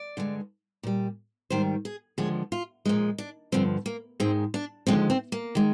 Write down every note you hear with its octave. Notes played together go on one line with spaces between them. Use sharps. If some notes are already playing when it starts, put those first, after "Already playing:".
Already playing: D5
G2 D3 G#3
A#2 G3
G#2 D#3 G3 C5
G#4
D#2 D3 F3 G#3 G#4
F4
A#2 F3 G#3 D#4
D4
G2 D3 F3 C4
A#3
G#2 D#3 G#3 C4
D4
D#2 D3 F3 G#3 C4
C4
A#3
D#3 G#3